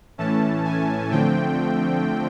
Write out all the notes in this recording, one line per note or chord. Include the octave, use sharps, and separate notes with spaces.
A2 E3 A3 C#4 A5
G#5
D3 F3 A3 C4 G5